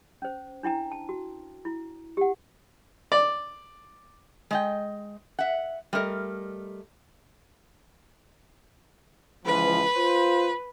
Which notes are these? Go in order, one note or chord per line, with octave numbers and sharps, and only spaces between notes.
C#4 C5
D4 E4 G5 A#5
A5
F#4
E4
G4 F#5
D5
G#3 D#5 G5
E5 F#5
G3 A3 A#4 D#5
C#2 E3 F3 B4
F4 C5